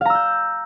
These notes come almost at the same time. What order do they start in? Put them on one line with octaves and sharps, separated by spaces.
F5 A#5 E6 G6